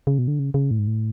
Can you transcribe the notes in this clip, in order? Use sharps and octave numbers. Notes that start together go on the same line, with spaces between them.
C#3
B2
D3
C#3
C#3
A2
G#2
A2